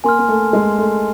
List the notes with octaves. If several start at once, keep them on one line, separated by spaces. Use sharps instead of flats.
A#3 G#5 C6 F6
A#3
A3
G#3
A3